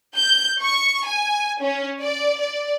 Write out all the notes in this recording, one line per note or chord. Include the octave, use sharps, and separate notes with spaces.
G6
C#6
G#5
C#4
D5
D5